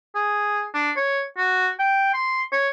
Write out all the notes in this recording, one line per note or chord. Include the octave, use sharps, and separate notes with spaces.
G#4
D4
C#5
F#4
G5
C6
C#5